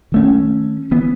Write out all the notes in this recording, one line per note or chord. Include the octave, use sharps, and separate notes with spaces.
D#3 A3 C#4
E3 B3